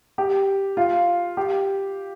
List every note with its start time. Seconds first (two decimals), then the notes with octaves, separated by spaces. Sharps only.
0.18 G4
0.77 F4
1.37 G4